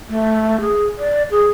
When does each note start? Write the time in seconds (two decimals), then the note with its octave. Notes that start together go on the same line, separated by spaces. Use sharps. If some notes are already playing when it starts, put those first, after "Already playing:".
0.09 A3
0.61 G#4
0.98 D5
1.31 G#4